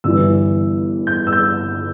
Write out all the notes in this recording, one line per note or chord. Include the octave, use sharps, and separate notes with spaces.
G1 G2 E3 E6
G6
E6
G6